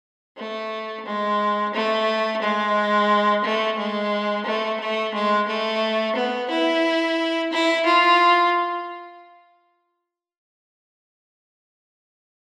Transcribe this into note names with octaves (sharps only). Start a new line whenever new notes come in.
A3
G#3
A3
G#3
A3
G#3
A3
A3
G#3
A3
B3
E4
E4
F4